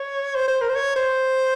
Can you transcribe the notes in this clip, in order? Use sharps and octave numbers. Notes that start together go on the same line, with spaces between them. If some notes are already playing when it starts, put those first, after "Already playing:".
Already playing: C#5
C5
C5
A#4
C5
C#5
C5